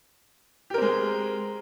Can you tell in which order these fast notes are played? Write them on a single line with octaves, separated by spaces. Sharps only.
G4 A#4 C4 G#3